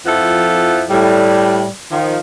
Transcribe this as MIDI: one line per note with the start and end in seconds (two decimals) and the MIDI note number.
0.06 0.82 41
0.06 0.82 53
0.06 0.82 64
0.06 0.82 69
0.06 0.82 78
0.89 1.66 45
0.89 1.66 55
1.92 2.19 51
1.92 2.19 53